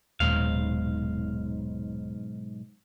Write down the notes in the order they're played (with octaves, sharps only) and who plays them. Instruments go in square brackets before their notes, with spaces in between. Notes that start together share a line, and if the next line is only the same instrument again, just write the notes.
[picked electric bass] D#1 [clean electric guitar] B1 G#2 F5